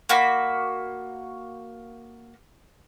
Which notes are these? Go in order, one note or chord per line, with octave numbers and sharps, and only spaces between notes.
A#3 F#4 B5